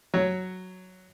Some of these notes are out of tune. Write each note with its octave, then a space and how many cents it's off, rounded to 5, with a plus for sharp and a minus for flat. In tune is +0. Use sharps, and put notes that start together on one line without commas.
F#3 +0 C#5 +0